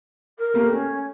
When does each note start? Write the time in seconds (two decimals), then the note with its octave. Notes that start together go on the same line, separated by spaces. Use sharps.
0.38 A#4
0.54 A3 A#3 G4
0.69 A3 C#4